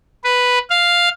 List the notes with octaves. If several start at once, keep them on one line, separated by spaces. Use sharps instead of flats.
B4
F5